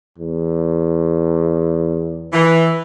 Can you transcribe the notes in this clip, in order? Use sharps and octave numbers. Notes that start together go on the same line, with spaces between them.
E2
E3